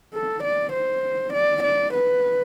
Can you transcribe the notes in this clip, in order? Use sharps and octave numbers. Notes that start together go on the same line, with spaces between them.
A4
D5
C5
D5
D5
B4